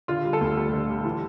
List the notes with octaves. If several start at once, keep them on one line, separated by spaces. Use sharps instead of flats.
D3 F4
G3
A4
D2
D2
D3
G3
E3